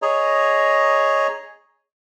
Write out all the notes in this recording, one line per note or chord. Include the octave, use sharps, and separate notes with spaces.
G#4 C#5 D#5 A#5